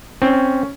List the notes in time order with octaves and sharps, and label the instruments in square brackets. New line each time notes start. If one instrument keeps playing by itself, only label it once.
[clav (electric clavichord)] C4 [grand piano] C#4